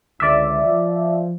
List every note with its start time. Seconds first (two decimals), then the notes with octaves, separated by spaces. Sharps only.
0.20 C#2 D3 D5 E5
0.64 F3